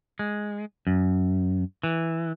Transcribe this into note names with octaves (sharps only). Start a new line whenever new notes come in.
G#3
F#2
E3